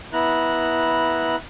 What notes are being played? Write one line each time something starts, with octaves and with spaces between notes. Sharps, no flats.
B3 E4 A#5 F#6